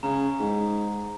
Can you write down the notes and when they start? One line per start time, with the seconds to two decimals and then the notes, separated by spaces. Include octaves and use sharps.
0.03 C#3 A#5
0.40 G#2